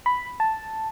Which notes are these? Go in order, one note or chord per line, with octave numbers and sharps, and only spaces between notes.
B5
A5